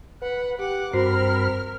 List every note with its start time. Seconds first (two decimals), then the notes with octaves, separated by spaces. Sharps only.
0.22 B4 F#5 B5
0.59 G4 F#5 D6
0.93 G2 C4 F#4 A#4 C5 B5 F6 C7